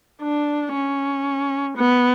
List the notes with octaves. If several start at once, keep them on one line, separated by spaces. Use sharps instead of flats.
D4
C#4
B3